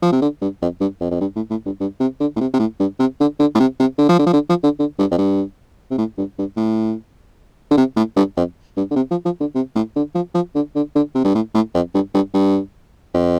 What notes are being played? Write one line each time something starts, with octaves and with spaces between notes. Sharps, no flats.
F3
C3
D3
G2
F2
G2
F2
F2
G2
A2
A2
G2
G2
C3
D3
A2
C3
C3
A2
G2
C3
D3
D3
A2
C3
C3
D3
F3
D3
F3
D3
F3
D3
D3
G2
F2
G2
C3
A2
G2
G2
A2
D3
C3
A2
G2
F2
G2
D3
C3
F3
F3
D3
C3
A2
D3
F3
F3
D3
D3
D3
C3
G2
A2
A2
F2
G2
G2
G2
F2